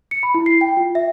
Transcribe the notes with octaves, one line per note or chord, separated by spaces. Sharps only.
C#7
B5
E4
C7
G5
F4
E5